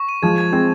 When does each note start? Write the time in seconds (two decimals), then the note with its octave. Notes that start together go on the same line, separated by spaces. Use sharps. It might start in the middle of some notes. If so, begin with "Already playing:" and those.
Already playing: C#6
0.09 D#7
0.22 F3 G#3 G#6
0.38 G#6
0.52 G#3 C4 G#6